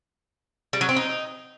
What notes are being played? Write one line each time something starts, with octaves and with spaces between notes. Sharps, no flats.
G3
F#3
C4
D#4